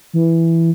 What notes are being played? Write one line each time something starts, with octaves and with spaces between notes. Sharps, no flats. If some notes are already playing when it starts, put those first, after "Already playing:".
E3